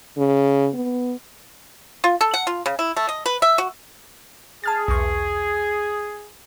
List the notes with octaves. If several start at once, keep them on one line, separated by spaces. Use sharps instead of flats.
C#3
B3
F4
A4
F#5
F4
C#3
E4
A3
D#5
B4
E5
F#4
G#4 A5 F6 A6
B1 E2 C#6